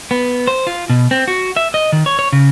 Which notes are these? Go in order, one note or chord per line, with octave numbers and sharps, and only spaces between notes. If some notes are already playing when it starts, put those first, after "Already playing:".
B3
C5
F4
B2
C4
F#4
E5
D#5
D#3
C#5
C#5
C#3